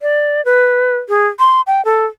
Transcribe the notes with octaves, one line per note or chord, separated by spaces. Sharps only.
D5
B4
G#4
C6
G5
A4